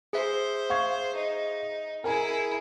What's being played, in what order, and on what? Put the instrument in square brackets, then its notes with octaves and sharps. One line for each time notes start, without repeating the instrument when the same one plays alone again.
[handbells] G#4 E5 [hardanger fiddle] C5
[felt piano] F5 C#6 G#6
[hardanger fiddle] D#4
[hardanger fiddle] E4 G#4 [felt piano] A#4 G#5 A#5